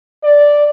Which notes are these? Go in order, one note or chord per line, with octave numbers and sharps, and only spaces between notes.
D5